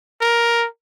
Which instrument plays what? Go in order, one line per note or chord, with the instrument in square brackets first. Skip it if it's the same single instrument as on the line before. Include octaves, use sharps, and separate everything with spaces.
[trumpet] A#4